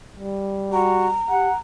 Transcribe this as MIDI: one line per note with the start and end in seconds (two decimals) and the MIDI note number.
0.17 1.20 55
0.72 1.08 66
0.72 1.58 82
1.30 1.49 67
1.30 1.54 78